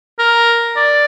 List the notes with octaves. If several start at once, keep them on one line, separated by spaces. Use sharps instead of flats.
A#4
D5